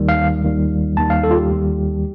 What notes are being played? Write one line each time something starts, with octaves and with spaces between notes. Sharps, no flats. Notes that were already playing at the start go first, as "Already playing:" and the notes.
Already playing: D#2 D#3 G3
F5
D#2 D#3 G3
D#2 D#3 G3 A5
F5
A4
F4
G4
D#2 D#3 G3